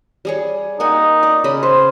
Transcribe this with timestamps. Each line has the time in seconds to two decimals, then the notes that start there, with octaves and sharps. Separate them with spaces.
0.25 G3 G#4 C#5
0.80 A#3 D#4 F#5 G#5
1.23 D5
1.44 C#3 D#5 B5
1.63 B4 C5